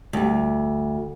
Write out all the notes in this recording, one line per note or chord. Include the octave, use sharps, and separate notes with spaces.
D2 G3